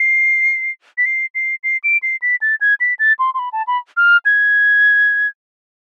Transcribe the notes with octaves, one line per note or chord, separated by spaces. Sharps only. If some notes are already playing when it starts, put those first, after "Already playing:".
Already playing: C7
B6
C7
C7
C7
D7
C7
B6
A6
G#6
B6
A6
C6
C6
B5
A5
B5
F6
G#6